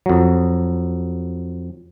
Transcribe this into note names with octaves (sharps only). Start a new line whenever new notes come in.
F2 F#3